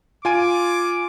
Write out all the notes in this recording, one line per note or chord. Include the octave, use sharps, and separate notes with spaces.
F4 G#5 D6 D7